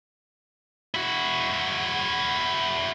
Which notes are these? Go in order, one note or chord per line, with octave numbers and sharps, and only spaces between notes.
E4 F#4